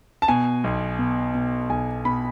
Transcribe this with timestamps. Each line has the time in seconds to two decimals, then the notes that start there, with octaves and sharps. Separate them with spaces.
0.22 A5
0.28 B2 G#5
0.64 B1
0.99 B2
1.34 B2
1.70 B1 G#5
2.05 B2 B5